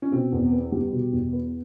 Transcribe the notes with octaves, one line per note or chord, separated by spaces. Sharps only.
C#4
B2 C4
E2
B3
G3
B2
E2
B3